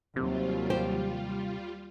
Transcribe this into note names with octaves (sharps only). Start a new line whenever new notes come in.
D#2 C3 F#3 G3 F4
G4 C5